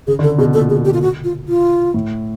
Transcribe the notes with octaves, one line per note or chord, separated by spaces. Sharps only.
C#3 G#4
D3
C#3 A4
B2 G#4
A#2 A4
G#4
G4
F4
F#4
F4
F4
A2